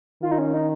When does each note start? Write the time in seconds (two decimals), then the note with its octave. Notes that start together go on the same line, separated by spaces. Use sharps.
0.22 D#3 F4
0.31 D#4
0.38 C#4
0.54 D#4